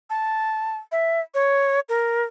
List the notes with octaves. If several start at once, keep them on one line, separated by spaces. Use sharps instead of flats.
A5
E5
C#5
A#4